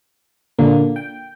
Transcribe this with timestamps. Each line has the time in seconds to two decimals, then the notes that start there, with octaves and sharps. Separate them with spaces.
0.59 A#2 D3 A#3
0.96 G5